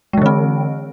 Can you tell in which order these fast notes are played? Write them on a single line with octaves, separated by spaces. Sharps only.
G#3 E3 D3 C4